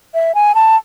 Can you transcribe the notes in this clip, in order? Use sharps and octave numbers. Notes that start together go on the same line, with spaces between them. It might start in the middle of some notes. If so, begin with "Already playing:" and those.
E5
G#5
A5